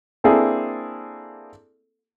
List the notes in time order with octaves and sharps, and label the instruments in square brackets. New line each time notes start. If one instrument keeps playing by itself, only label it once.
[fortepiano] A#3 C4 D4 E4 G#4 A4